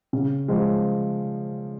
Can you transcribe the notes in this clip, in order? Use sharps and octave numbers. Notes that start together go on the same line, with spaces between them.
C#3
F3 G#3